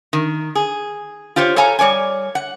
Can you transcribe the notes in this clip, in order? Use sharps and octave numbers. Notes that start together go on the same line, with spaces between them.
D#3
G#4
F4 G4 C5 C#5
A4 C#5 F5 G#5 A#5
G3 C#5 D5 G#5
F#5